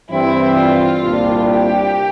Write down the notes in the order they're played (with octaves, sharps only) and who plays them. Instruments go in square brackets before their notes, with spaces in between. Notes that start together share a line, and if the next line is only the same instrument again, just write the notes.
[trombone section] G2 E3 G3 C4 [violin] E4
[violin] F4
[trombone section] C2 A#2 G3 D4
[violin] G4